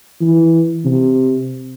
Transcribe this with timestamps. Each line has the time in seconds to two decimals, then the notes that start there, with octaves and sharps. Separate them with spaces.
0.21 E3
0.85 C3